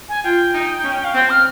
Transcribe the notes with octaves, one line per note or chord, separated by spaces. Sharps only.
G#5
F4 G5
D#4
C#4
F5
C4 G5
F6